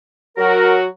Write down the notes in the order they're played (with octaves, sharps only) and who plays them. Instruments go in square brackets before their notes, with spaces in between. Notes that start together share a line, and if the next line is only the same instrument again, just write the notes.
[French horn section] F#3 F#4 [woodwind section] A#4